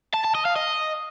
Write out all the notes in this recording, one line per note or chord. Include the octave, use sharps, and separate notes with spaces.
A5
A5
D#5
F5
D#5